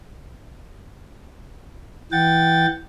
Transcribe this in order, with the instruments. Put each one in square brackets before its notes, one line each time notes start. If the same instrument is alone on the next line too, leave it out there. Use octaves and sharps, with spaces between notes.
[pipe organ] E3 F#5 G5 A6